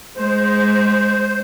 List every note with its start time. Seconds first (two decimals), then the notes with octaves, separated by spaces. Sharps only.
0.17 G#3 C5